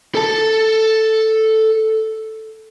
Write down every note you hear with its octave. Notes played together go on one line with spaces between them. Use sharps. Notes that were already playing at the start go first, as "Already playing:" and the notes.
A4 A5